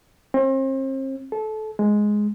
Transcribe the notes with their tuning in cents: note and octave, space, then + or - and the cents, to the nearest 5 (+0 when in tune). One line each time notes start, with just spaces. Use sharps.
C4 +40
A4 -25
G#3 +5